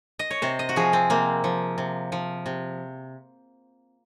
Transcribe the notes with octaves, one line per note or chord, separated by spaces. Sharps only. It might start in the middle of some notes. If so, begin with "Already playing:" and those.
D#5
C#5
C3 C5
D#5
F#4
F3 G#4
C4
C3 A#3
F3
C3
F3
C3